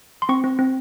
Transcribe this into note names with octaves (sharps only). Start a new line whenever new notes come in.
C6
C4 C#6
C4
C4